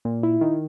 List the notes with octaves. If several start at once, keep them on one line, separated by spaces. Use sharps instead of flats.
A#2
E4
D#3